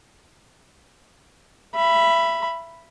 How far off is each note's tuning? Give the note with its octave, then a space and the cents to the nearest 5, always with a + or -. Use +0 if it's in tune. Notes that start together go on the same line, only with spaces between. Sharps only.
E5 +25 B5 +0